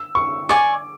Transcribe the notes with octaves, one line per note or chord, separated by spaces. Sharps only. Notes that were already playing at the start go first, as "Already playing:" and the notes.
Already playing: E6
C#6
D5 G#5 C#6 D6